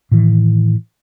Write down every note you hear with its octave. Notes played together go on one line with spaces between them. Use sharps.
A2 D#3 E3